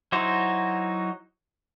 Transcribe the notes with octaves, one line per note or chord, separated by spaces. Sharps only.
F#3 D#4 E4 F#4 C5